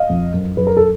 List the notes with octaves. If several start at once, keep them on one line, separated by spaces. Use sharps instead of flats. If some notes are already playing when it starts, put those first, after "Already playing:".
Already playing: D#5 F5
F2
F#2
F#2 B4
A#4
A4